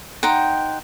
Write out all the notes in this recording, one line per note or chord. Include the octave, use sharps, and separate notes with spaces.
D#4 C5 F#5 G5